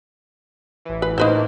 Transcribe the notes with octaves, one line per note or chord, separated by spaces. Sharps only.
A1 E3
B4
A2 A#3 D4 D#4 B4 C5